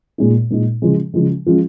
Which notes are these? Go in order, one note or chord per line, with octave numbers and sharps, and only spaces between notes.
A#2 G#3 D#4
A#2 G#3 D#4
C#3 F3 G#3
C#3 F3 G#3
F3 G#3 C#4 F4